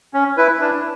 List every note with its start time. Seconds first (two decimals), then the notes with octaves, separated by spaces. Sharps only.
0.14 C#4
0.37 E4 B4
0.61 D4